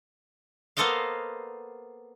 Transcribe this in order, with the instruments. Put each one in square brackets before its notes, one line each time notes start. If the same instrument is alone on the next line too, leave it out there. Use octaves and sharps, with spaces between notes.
[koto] A#3 B3 A4 C5 D#5 F5